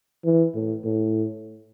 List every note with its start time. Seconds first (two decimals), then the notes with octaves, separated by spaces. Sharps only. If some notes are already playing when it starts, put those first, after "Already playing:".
0.25 E3
0.55 A2
0.84 A2